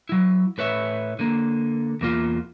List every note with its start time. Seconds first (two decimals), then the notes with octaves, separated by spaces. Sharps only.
0.09 F#3 E4
0.58 A2 B4 C#5 E5
1.19 D3 A#3
2.01 E2 A#3 F4